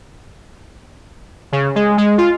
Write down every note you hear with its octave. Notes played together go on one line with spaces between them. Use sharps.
C#3
G#3
G#3
F4